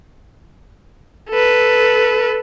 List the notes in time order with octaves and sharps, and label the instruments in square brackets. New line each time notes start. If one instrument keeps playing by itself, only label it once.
[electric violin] A4 B4